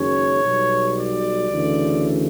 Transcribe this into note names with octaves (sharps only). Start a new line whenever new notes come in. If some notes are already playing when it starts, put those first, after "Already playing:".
Already playing: F#1 F#2 D#3 G#3 C#4 C#5
B1 B2 G3
D5
D2 C#3 E3 A3